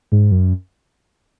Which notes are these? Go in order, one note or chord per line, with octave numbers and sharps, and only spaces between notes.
G#2
F#2